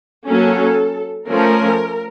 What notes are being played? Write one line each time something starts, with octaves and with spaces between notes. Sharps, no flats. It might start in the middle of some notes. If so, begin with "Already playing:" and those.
F#3 A#3 C#4 A4
F3 A3 C#4 A#4